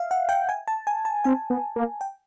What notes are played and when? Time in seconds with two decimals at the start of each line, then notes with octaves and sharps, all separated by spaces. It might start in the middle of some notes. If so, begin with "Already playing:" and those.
Already playing: E5 F5
0.11 F#5
0.29 G5
0.49 G#5
0.68 A5
0.87 G#5
1.05 A5
1.24 C4 G#5
1.50 B3
1.76 A#3
2.01 G5